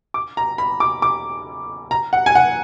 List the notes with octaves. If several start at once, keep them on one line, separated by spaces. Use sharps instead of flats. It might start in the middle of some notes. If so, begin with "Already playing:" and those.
D6
A#5
B5
D6
D6
A#5
F#5
G#5
F#5